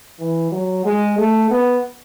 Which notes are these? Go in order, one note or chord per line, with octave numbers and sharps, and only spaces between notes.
E3
F#3
G#3
A3
B3